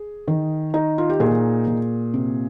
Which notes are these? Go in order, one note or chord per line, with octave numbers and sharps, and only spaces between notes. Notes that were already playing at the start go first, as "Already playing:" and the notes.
Already playing: G#4
D#3
D#4
F4
G4
A#2 G#4
A#2
C3